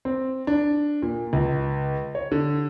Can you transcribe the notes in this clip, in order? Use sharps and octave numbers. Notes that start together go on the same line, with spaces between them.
C4
D4
A#2
C#2
C#5
D3